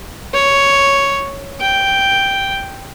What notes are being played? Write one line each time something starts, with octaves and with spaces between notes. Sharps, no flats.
C#5
G5